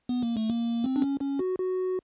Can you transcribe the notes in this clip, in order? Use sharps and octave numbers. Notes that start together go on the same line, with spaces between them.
B3
A#3
A3
A#3
C4
D4
C#4
C#4
F#4
F#4